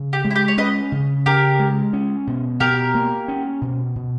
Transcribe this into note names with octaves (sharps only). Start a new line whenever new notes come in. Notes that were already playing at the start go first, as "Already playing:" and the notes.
Already playing: C#3
G4
G#3
E4
G4
C#5
C#4 B4 D#5
C#3
C#3 G4 A#4
G#3
C#4
B2
B2 G4 A#4
A#3
C#4
B2
B2